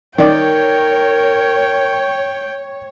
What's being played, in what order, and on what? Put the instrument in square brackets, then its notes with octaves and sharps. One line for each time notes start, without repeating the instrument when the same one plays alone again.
[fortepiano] D#3 D5 [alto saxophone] A#4 [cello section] C#5 [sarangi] G5